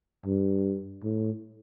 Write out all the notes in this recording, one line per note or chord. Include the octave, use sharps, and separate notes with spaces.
G2
A2